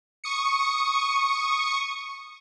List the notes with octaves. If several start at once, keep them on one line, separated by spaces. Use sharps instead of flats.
C#6 D#6 C#7